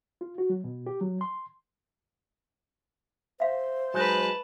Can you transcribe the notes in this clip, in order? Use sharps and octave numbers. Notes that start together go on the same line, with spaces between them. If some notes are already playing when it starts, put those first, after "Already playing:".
F4
F#4
F#3
B2
G4
F#3
C6
C5 E5 F5
F#3 G#3 D#4 B4 A5